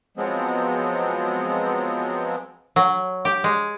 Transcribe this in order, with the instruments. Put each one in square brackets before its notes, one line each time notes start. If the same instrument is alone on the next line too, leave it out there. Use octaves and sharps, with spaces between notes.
[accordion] F3 F#3 G#3 B3 C4
[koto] F#3
G4
G#3